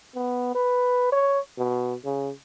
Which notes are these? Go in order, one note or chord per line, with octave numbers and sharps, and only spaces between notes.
B3
B4
C#5
B2
C#3